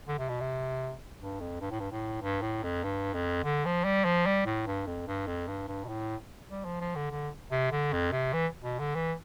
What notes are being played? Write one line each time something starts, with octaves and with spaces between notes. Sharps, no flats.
D3
C3
B2
C3
G2
F2
G2
A2
G2
A2
G2
A2
F2
G2
F2
D3
F3
G3
F3
G3
A2
G2
F2
G2
F2
G2
G2
B2
A2
G3
F3
F3
D3
D3
C3
D3
F2
C3
E3
B2
D3
E3